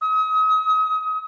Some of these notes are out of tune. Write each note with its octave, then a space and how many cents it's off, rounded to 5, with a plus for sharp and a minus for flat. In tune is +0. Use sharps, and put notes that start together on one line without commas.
D#6 +35